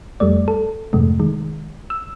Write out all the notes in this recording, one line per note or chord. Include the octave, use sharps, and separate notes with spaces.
F2 G3 A3 D5
A4
F2 G#2 C3 G#3 A3
D#3 G#3
E6